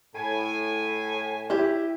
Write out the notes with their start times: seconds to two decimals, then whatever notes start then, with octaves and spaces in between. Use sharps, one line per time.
0.15 A2 G#5
1.50 E4 G4